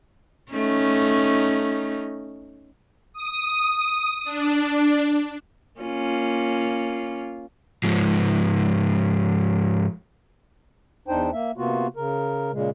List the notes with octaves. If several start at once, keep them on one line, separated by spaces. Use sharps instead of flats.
A3 C#4 D#4
D#6
D4
A#3 C#4 F4
G#2 F3
E2 D4 D#4 C5 G5
A#3 E5
C3 A#3 B3 F4 F#4
C#3 A#4
A#2 C#3 G#3